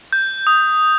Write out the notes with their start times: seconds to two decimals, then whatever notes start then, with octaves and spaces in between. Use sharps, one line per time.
0.12 G6
0.47 D#6